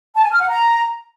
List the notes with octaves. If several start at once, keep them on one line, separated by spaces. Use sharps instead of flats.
A5
G#5
F6
F#5
A#5